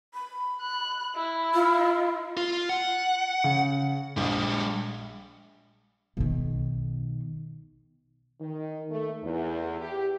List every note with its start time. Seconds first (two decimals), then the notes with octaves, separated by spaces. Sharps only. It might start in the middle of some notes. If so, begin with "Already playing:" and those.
0.14 B5
0.61 F#6
1.16 E4
1.54 F4
2.37 F4
2.69 F#5
3.44 C#3
4.17 A#1 G3 G#3
6.17 B1 D#3
8.41 D#3
8.90 A3
9.23 E2
9.80 G4